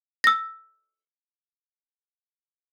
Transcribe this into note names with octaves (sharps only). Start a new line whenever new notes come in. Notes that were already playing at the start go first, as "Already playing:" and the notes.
E6 A#6